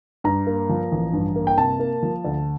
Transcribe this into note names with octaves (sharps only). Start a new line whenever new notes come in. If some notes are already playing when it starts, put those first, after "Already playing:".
G2 A#5
A#3
F3
A1
G2
A#3
G5
C3 A5
A#3
F3
D2